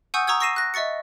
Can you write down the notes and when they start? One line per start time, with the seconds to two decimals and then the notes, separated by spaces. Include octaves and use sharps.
0.14 F#5 G#5 C#6 D#6 E6 G6
0.27 A#5 C#6 D#6 E6 G#6
0.40 C#6 E6 A#6 C7 D#7 E7
0.56 F#6 A#6
0.74 D#5 E5 C#6 A6 C#7